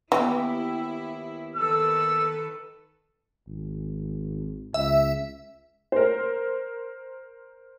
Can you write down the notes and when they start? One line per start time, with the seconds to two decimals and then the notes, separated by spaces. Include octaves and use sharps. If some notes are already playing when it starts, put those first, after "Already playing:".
0.12 D#2 E3 B3 E4 G4
1.56 D#3 A4 B4 E6
3.47 G#1
4.74 C#2 E5
5.92 A#4 C5